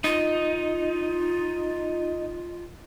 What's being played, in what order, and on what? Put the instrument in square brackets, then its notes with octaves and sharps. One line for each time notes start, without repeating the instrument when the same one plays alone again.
[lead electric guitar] D#4 [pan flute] F4